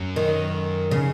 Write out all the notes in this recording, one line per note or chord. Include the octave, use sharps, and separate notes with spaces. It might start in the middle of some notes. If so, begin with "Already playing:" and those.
Already playing: F#2
D#3
C#3